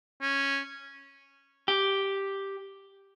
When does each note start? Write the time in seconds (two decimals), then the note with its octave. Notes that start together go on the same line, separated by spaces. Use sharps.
0.21 C#4
1.68 G4